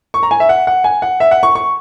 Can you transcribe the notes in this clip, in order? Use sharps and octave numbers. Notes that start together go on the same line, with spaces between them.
C#6
A#5
G#5
E5
F#5
F#5
G#5
F#5
E5
F#5
C#6
C#6